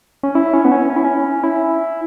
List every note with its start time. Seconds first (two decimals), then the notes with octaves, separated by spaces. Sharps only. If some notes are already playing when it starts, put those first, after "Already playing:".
0.23 C#4
0.35 E4
0.53 C#4
0.65 B3
0.72 C#4
0.90 C#4
0.96 E4
1.04 C#4
1.44 E4